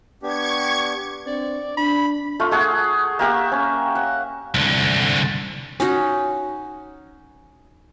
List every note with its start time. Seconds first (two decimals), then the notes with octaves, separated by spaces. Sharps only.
0.22 B3 D4 G4 C#6 G#6
1.27 C4 D4 D5
1.77 D4 B5
2.40 A3 F4
2.51 A3 G#4 F#5
3.19 A#3 G4 E5 F#5
3.52 C#4
3.95 F#5
4.54 C2 D3
5.80 C#4 D#4 F#4